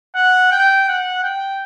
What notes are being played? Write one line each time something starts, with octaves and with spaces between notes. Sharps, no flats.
F#5
G5
F#5
G5